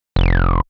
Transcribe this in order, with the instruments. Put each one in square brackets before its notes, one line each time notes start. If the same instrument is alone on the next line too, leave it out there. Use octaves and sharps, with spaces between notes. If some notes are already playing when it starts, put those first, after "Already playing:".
[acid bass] F1